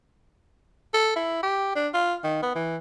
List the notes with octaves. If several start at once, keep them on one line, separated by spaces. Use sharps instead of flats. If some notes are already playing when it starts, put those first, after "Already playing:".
A4
E4
G4
D4
F4
D#3
B3
E3